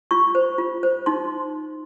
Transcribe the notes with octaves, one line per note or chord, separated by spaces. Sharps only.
F4 C#6
C5
F4
C5
D#4 C6